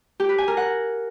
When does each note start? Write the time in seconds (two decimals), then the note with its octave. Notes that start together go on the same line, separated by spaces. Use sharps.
0.20 G4
0.29 B4
0.38 G#5
0.48 A#4
0.57 F#5